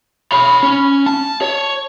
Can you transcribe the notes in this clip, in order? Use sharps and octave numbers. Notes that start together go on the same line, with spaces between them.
C#5 B5
C#4
A5
C#5